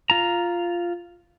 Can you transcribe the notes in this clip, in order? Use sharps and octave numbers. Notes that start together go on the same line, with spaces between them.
F4 A#5